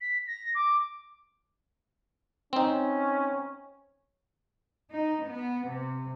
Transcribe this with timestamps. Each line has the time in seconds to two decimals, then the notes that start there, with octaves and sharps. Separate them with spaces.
0.01 B6
0.27 A#6
0.55 D6
2.53 C4 C#4 D#4
4.90 D#4
5.25 B3
5.69 C3